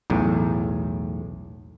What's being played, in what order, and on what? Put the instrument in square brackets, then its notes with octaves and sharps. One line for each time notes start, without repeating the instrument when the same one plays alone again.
[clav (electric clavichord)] B1 E2 A2